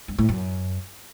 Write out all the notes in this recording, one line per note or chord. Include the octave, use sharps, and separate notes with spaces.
G2
A2
F#2